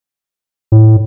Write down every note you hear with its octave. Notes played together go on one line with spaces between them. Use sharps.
A2